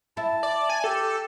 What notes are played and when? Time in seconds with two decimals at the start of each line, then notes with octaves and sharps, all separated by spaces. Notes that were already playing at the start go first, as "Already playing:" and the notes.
0.17 E4 A5
0.43 D5
0.70 G#5
0.84 G4 A4 A5